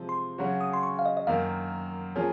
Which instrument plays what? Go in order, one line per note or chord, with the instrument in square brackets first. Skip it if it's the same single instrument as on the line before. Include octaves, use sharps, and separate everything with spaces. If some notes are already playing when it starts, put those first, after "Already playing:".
Already playing: [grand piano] C3 F3 G#3 C4
[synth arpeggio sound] C6
[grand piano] C#3 F#3 C#4 F#4
[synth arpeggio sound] D#6
C6
C#6
F5
D#5
D#5
[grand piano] F#2 D#3 A#3 [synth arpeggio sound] F5
[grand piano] F3 A#3 C#4 G#4